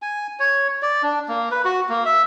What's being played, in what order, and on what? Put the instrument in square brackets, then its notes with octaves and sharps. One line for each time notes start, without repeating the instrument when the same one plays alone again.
[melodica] G#5
C#5
D5
D4
A#3
B4
F#4
A#3
E5